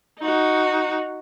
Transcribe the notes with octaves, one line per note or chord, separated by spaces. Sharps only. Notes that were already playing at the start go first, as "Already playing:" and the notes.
D#4 F#4